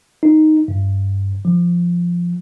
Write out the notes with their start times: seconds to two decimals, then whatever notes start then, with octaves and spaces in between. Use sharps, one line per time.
0.23 D#4
0.68 G2
1.45 F3